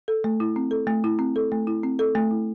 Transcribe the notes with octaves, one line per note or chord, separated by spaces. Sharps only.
A4
A3
E4
C4
A4
A3
E4
C4
A4
A3
E4
C4
A4
A3
E4